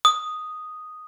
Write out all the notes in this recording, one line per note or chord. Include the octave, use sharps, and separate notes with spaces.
D#6